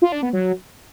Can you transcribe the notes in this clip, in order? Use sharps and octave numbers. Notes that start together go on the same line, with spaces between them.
F4
D4
B3
F#3